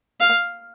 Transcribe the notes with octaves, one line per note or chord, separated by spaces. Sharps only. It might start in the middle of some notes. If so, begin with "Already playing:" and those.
F5